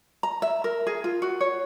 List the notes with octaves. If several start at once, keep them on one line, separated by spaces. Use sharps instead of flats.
A#5
E5
A#4
G#4
F4
F#4
C#5